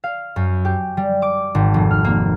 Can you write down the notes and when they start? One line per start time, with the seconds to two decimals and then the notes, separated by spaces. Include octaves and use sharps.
0.04 F5
0.36 F#2
0.65 G4
0.97 G3
1.22 D6
1.55 G#1
1.74 F1
1.91 F6
2.04 A#3